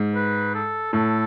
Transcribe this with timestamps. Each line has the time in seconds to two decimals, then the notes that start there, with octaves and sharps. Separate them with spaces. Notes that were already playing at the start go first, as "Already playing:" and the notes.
Already playing: G#2
0.15 B4
0.55 A4
0.93 A2 A4